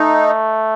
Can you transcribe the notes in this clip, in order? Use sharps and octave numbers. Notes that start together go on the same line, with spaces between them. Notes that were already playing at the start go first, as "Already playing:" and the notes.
Already playing: A3 D#4